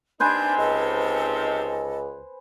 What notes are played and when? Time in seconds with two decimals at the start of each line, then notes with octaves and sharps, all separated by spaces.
0.20 C3 D4 D#4 B4 C5 G#5 G6
0.58 C#2 A4 D#5